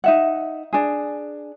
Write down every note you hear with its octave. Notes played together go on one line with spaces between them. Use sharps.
D#4 E5 F#5
D4 G#4